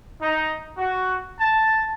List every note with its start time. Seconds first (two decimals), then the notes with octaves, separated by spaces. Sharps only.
0.21 D#4
0.77 F#4
1.39 A5